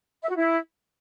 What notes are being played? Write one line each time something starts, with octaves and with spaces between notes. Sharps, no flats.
E5
F#4
E4